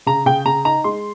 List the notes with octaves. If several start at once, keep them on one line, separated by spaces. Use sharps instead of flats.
C#3 A#5
C#3 G5
C#3 A#5
D#4 A#5
G#3 C6